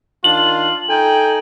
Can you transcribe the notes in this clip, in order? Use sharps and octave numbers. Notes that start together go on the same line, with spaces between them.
D#3 D4 F4 F#7
D#4 A4 G5 G#5